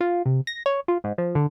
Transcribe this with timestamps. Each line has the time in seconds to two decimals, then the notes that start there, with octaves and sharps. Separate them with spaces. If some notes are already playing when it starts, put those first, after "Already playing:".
0.01 F4
0.25 C3
0.47 A#6
0.66 C#5
0.88 F4
1.04 G#2
1.18 F3
1.35 D3